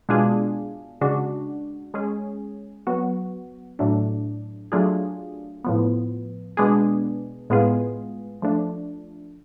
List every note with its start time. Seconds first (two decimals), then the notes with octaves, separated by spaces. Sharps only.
0.09 B2 G#3 D4 F4 G#4
1.01 C#3 G#3 D4 F#4
1.94 G#3 C#4 G#4
2.87 F#3 B3 F#4
3.79 A2 F#3 A3 D4
4.72 F#3 A3 D4 F4 G#4
5.64 A2 F3 B3
6.57 B2 G#3 B3 D4 G#4
7.50 A2 G#3 B3 F4 G#4
8.42 F3 A3 D4